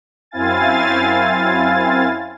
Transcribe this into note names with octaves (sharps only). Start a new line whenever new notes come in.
F#2 C4 E4 F5 G#5 A6